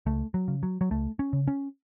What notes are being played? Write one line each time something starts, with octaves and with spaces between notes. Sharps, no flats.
C#2 A3
F#3
C#3
F#3
F#3
C#2 A3
C#4
C#3
C#4